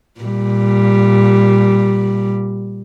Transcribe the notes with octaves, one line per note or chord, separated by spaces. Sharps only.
A#2 G3